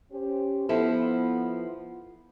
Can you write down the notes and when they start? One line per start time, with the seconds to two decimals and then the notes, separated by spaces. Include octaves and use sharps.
0.12 C#4 G4 C5
0.69 F3 B3 E4 A4